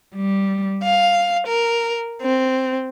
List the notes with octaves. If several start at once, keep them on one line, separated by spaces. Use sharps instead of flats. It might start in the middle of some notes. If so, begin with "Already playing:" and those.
G3
F5
A#4
C4